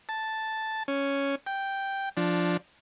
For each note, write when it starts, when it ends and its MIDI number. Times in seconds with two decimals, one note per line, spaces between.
0.09 0.83 81
0.88 1.35 61
1.47 2.09 79
2.17 2.57 53
2.17 2.57 62